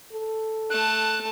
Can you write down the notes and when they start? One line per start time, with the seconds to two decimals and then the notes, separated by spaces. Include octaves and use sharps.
0.13 A4
0.71 A3 A5 F#6